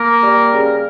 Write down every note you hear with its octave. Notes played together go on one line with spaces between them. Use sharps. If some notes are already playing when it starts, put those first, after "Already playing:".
Already playing: A#3 A#4
G3
C#3